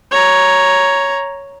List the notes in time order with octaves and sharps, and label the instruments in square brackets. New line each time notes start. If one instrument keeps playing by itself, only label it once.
[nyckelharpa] C#5 A#5